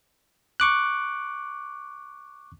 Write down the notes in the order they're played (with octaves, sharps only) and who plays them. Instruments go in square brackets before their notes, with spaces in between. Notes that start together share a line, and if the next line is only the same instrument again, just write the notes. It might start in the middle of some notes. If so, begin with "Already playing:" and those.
[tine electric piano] C#6 D6 F#6